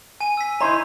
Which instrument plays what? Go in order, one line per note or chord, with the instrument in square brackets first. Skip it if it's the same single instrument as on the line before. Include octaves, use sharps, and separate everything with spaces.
[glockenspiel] G#5 D#7
E6 B6
[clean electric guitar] D#4 E4 C5 [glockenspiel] A#5